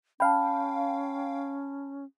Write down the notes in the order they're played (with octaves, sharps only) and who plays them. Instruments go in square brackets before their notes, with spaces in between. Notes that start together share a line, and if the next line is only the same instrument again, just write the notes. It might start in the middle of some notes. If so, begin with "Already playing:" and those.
[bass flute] C#4 [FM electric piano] F5 G5 [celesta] A5 B5